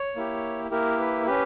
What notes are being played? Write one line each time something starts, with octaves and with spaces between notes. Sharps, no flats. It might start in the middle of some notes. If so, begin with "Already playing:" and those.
Already playing: C#5
A#3 E4 G4
A#3 E4 G4 A#4
B4
C#4 G4 B4